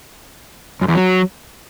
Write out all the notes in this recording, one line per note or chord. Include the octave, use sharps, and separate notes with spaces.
F#2
E2
F#3